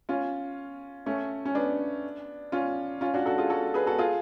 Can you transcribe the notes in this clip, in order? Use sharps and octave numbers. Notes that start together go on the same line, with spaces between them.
C#4 F4
A3 C#4
C#4
B3 D4
C#4 F4
C#4 F4
D4 F#4
F#4 A4
F4 G#4
F#4 A4
G#4 B4
F#4 A4
F4 G#4